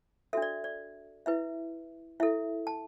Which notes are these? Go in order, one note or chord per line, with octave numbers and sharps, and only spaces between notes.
D4 F#4 A4 E5
D5
D5
E4 B4 E5
E4 A4 E5
A5